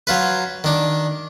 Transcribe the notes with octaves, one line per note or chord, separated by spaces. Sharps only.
F#3 F4 B4
D#3 D4